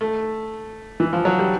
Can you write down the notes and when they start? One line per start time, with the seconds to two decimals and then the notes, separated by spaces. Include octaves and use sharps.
0.01 A3
1.00 E3
1.13 F3
1.25 F#3
1.39 G3